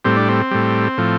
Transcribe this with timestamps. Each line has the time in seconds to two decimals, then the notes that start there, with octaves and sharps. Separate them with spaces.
0.05 A2 G3 C4
0.17 D4
0.28 C4
0.51 A2 G3
0.98 A2 F3